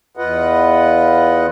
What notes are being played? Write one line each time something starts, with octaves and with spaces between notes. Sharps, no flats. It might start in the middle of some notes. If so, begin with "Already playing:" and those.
E2 F4 B4 D#5 F#5